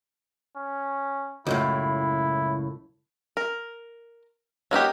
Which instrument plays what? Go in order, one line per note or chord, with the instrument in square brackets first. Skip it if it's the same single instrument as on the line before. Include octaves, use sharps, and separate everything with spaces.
[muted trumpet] C#4
[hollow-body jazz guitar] C#2 F#2 A2 [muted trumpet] E4
[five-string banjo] A#4
F#3 A#3 D#4 G4